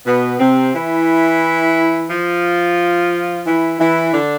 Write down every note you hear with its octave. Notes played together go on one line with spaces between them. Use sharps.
B2 B3
C3 C4
E3 E4
F3 F4
E3 E4
E3 E4
D3 D4